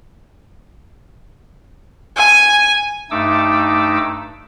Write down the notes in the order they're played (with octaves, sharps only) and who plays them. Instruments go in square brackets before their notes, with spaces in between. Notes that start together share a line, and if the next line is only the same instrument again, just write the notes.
[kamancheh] G#5
[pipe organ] G2 A3 D#4 D6 E6